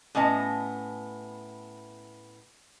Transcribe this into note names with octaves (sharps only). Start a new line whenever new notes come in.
A2 B3 C#4 D#5 A5